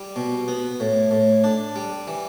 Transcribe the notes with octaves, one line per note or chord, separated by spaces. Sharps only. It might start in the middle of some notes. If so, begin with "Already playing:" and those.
Already playing: G3
B2
B3
A2
A2
D4
G3
E3